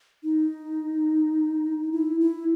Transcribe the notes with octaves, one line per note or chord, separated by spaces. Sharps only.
D#4
E4
E4